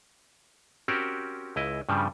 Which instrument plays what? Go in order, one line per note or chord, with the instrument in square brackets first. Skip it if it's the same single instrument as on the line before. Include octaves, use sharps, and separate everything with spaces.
[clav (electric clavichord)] C4 C#4 F#4 G4 A#4 C5
C#2 E4 D#5
G2 C#3 F3 G3